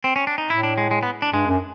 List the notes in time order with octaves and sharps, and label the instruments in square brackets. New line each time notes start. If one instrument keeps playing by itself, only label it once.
[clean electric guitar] C4
C#4
D4
D#4
[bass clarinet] A2 [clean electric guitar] E4
[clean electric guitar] D4
G#3
G#3
B3
D4
[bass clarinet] G2 [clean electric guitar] G#3
[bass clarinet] F#2